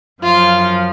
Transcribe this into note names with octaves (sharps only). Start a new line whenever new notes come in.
F#2 F3 F4